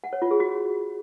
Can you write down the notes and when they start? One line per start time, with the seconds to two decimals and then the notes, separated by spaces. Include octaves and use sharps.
0.04 F#5
0.13 C#5
0.22 F4
0.31 G#4
0.40 F#4